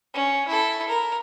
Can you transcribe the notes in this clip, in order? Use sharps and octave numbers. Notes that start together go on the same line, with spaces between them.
C#4
E4 A4
A#4